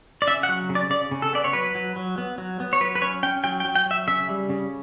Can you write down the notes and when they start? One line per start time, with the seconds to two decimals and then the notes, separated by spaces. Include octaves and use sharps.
0.22 D5
0.27 C#3 E5
0.43 F#5
0.49 F#3
0.69 C#3
0.75 D5
0.90 C#3 D5
1.11 C#3
1.22 A4
1.33 B3 D5
1.44 C#5
1.53 F#3 B4
1.75 F#3
1.96 F#3
2.18 B3
2.38 F#3
2.60 B3
2.73 C#5
2.81 F#3 B4
2.95 B4
3.02 C#4 C#5
3.23 C#4 G5
3.44 F#3 G5
3.60 G5
3.65 F#3
3.75 G5
3.86 F#3 E5
4.07 C#3 E5
4.29 G3
4.49 C#3